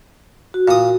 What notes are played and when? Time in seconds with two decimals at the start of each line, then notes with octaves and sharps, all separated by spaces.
0.54 F#4
0.68 A#2 D#6